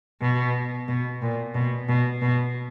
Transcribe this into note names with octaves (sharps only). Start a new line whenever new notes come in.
B2
B2
A#2
B2
B2
B2